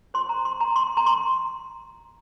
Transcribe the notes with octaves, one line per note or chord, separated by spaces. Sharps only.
F4 C5 C6
A#5
C6
A#5
C6
A#5
C6